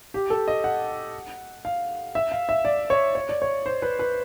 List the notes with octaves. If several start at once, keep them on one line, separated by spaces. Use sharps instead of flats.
G4
A4
D#5
F#5
F5
E5
F5
E5
D5
C#5
C#5
D5
C#5
C5
B4
B4